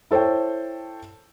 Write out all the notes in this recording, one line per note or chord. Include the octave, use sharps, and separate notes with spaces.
E4 A4 C5 C#5 G5